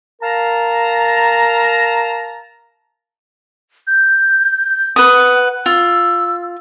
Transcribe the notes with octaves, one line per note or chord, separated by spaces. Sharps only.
A#4 F5 A5 A#5
G6
B4 F#5 D#6
F4 E6